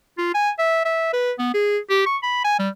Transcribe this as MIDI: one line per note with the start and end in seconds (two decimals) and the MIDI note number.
0.18 0.32 65
0.35 0.51 80
0.59 0.83 76
0.85 1.12 76
1.13 1.32 71
1.39 1.54 59
1.54 1.78 68
1.90 2.03 67
2.06 2.18 85
2.23 2.41 83
2.44 2.58 80
2.59 2.69 55